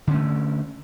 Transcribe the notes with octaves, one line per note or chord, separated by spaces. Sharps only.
D3 A3 C#4